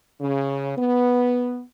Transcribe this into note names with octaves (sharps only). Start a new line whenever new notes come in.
C#3
B3